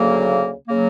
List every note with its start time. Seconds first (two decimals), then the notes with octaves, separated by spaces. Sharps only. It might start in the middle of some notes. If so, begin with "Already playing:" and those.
Already playing: D2 C#3 F#3 A#3
0.68 C#3 F#3 A#3